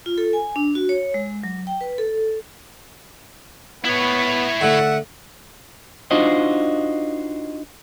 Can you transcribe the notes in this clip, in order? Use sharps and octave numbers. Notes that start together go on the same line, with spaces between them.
F4
A4
G#5
D4
F#4
C#5
G#3
F#3
G5
B4
A4
B3 E4 C#5
D3 A3 E5 F#5
D4 D#4 F4 F#4 C5 D#5